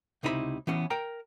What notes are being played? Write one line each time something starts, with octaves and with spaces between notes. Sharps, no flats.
C#2 C3 D#4 E4 B4 B5
E3 B3 C#4
A#4 G5 A#5